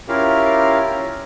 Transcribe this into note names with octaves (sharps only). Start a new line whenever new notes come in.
C#4 E4 F4 G4 A#4 F5